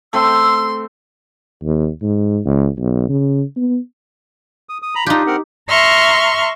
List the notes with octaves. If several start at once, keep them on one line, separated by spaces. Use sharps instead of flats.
A3 C4 G5 C6 E6
D#2
G#2
C#2
B1
C#3
B3
D#6
D#6
A#5 B5
D4 D#4 F4 G4
C4 A#4 F#5
E5 A#5 C6 C#6 F6